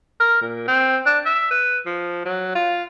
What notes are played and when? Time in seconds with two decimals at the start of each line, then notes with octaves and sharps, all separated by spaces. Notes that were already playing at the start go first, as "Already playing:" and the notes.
0.20 A#4
0.41 A#2
0.68 C4
1.06 D4
1.25 E5
1.51 B4
1.86 F3
2.25 F#3
2.55 F4